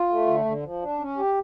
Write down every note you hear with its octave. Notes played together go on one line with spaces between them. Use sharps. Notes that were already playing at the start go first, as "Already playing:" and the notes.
Already playing: F4
A3
D3
D3
F3
D4
C#4
G4